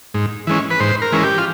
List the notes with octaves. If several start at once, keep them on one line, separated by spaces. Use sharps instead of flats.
G#2
E3 G#3 C#4
B4
G#2 C5
A#4
E3 G#3 C#4
G4
F4